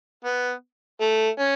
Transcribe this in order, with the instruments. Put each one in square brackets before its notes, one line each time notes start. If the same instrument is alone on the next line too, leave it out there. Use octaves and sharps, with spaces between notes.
[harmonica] B3
A3
C#4